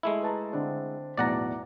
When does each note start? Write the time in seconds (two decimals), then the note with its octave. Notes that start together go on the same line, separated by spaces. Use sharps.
0.03 G#3 A3 E4
0.22 B4 A5 A#5
0.53 D3 C4 D4
1.18 B1 E2 A2 D5 F#5 A#5